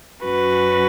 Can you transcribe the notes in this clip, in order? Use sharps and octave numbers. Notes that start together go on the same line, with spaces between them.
F#2 F#3 C#4 F#4 B4